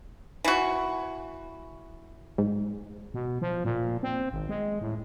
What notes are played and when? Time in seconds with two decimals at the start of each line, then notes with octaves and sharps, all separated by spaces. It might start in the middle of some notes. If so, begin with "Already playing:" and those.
0.44 E3 F#4
2.38 G#2
3.14 B2
3.42 F3
3.65 A#2
4.03 C4
4.32 G#1
4.49 G#3
4.81 A2